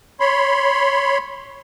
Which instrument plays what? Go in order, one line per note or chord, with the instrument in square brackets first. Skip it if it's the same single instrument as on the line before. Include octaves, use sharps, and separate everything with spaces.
[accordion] C#5 B5 C6